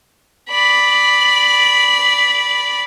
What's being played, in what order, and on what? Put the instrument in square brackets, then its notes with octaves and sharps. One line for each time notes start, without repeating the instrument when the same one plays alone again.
[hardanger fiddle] D5 B5